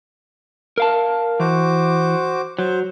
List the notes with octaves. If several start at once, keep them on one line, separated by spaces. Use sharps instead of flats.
A#4 F5 A5
E3 F#4 C5 D6
F#3 C5